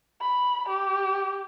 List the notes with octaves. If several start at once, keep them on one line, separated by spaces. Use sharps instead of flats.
B5
G4